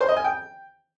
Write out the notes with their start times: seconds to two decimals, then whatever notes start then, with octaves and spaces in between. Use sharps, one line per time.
0.01 C5
0.08 D#5
0.16 G#5
0.24 G5